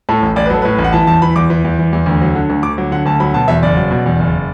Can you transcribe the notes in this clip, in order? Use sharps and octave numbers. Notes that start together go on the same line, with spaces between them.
A2 A4
A1
A1 D5
B4
F#3 A4
A2 B4
A1
F#5
E3 A5
E2 A5
E3 B5
E2 D6
E3
E2
E3
E2
D2
F#3
D3
D2
D2 D6
F#3
D3 F#5
D2 A5
F#3 B5
B2 A5
E2 E5
F#1 D5
F#3
B2
E2
F#1